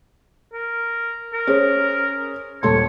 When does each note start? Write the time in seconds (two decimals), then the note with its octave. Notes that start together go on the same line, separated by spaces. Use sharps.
0.53 A#4
1.33 A#4
1.47 C#4 G#4 C5
2.63 D#1 A4 C#5 C6